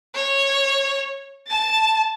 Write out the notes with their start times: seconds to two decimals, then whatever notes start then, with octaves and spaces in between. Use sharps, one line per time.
0.15 C#5
1.47 A5 A6